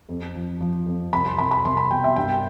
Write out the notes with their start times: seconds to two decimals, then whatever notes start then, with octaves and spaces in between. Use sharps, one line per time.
0.09 F2
0.35 F3
0.60 F3
0.86 F2
1.13 C2 B5
1.26 C6
1.38 C2 B5
1.51 B5
1.65 C2 C6
1.77 B5
1.90 B2 G5
2.04 E5
2.16 G2 G5